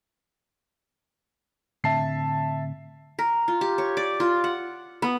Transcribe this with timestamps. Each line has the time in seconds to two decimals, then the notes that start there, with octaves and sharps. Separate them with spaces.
1.84 A2 D3 C4 E5 A5 C7
3.19 A#4
3.48 F4
3.61 G4
3.78 C#5
3.97 D5
4.20 F4
4.44 F#5
5.02 B3